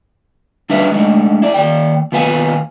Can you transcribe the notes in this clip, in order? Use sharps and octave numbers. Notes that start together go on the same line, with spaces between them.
G3 D4 D#4 B4 E5 F5
G#3 A3 D4 D#4
E4 D5
D#2 B2 D5 G5
D#2 B2 F4 B4 F5 G#5